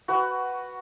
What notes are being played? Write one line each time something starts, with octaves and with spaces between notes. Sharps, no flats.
F#4 B4